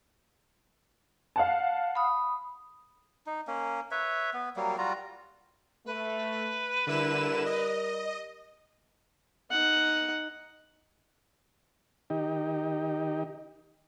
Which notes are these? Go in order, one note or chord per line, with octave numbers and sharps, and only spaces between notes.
F5 F#5 A5
B5 D#6
D#4
A#3 C#4
B4 C#5 E5
B3
F#3 G3 A#3
G3 F4 F#4 A#5
A3 B4
D3 G3 E4 A#4 E7
D#5
D#4 F#5
D#3 D#4 G4